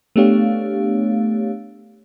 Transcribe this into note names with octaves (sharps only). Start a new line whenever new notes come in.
A3 B3 D4 G4 C#5 F5